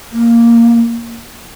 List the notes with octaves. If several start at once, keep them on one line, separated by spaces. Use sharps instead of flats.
A#3